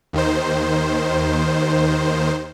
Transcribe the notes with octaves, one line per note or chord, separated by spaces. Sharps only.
D#2 D#3 C5